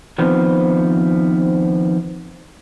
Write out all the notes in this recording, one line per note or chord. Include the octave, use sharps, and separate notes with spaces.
D#3 F3 B3 C4